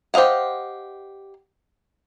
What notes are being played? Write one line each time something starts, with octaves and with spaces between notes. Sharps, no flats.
G4 C5 D#5 F5 F#5